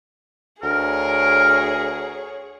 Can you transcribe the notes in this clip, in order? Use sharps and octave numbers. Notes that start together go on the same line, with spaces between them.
D2 G#4 A#4 C#5